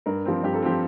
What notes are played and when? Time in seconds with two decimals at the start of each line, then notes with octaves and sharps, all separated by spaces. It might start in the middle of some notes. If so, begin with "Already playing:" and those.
0.06 G2 A#4
0.26 F3 C4
0.43 G2 G4
0.54 A4
0.63 F3 C4 G4